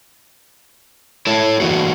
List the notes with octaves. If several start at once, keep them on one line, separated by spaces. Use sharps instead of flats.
E4 A4 C#5
E3 A#3 F#4